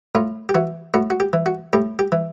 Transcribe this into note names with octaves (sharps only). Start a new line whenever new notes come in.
A2 F4
G4
E3 F#4
A2 F#4
F#4
G4
E3
F#4
A2 G4
G4
E3